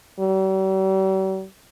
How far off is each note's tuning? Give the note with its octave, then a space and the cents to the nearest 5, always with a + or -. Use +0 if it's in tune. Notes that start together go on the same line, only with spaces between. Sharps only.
G3 -45